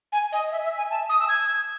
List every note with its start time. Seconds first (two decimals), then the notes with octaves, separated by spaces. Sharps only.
0.12 G#5
0.32 D#5
0.52 E5
0.64 E5
0.77 G#5
0.90 A5
1.09 D#6
1.20 E6
1.29 G#6